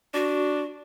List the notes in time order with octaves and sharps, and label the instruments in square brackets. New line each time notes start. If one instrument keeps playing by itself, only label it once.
[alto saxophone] D4 [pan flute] F#4